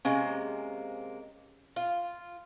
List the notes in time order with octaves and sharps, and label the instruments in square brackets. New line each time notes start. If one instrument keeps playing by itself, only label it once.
[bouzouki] C3 G#3 A#3 [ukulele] C#4
[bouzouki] F4